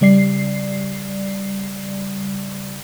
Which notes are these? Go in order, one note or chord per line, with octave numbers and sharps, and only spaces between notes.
C#3 G3 D5 C7